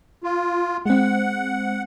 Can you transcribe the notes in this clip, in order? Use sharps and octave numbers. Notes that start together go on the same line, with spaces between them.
F4
G#3 C4 F#5